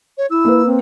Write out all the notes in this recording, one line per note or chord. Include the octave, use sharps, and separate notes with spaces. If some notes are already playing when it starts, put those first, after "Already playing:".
C#5
E4 E6
A#3 B4
C4